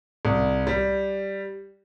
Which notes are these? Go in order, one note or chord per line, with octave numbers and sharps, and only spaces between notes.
C2
G3